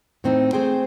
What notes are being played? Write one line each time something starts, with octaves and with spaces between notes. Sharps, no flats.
A2 A3 C4 D#4
A3 C4 G#4 C5 G5